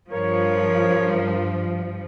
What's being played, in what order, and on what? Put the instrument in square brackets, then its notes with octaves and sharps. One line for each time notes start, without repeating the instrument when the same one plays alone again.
[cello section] G2 F3 [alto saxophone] A#4 [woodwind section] C#5